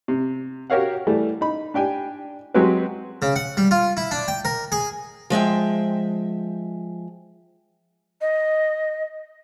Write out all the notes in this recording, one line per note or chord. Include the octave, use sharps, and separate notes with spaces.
C3
F#4 G4 A#4 C#5 F5 F#5
E3 G3 A3
D#4 B5
D4 G4 G5 G#5
F#3 G#3 C4 F#4 G4 B4
C#3
F#5
G3
F4
E4
D4
G5
A#4
G#4
F3 G#3 E5 G5
D#5